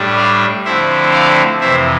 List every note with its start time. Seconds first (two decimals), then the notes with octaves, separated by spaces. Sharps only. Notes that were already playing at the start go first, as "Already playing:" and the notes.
Already playing: A2 G3 D4
0.17 D5 F5
0.65 D3 F3 A3 C4 E4 C5 E5
1.13 D5 F5
1.61 F2 C3 E3 C5 E5